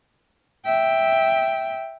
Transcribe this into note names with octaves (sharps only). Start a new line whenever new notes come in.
E5 G5